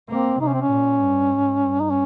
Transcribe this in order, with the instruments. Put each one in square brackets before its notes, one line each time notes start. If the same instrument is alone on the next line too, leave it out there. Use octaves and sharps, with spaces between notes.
[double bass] A#3 [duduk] C4
[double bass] C3 [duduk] D#4
[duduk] C#4
C4
C#4
[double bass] A#2
G2
G#2
G2
[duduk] D#4
C#4